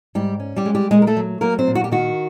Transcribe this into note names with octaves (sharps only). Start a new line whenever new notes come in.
G#2 G3 G4
C#4
G3 G4
G#3
G3 G4
A#2 G#3 G#4
A#4
A3 A4
F#3
F#3 A#3 A#4
C4 C5
A#2
F#4
G4
D#3 F#4